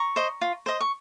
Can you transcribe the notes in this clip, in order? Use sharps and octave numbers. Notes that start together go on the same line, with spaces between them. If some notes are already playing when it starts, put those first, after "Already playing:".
Already playing: A#5 C#6
C5 D#5
F4
C5 D#5
C#6